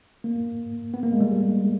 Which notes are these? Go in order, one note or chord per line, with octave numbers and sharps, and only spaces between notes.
A#3
B3
A#3
G#3
G3